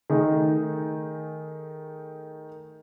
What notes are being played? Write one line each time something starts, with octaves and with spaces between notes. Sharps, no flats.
D#3 A3 D#4 G#4 D#5